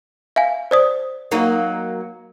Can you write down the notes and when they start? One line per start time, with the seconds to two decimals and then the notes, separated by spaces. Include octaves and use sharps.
0.36 E5 F5 G#5
0.71 C5 D5 D#6
1.31 F#3 A#3 D#4